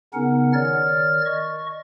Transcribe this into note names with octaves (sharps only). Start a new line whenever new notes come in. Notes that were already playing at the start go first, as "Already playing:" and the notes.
C#3 B3 C#4 D#4 A#4 F#5
D#3 C#5 D5 F6 A6
D#5 C#6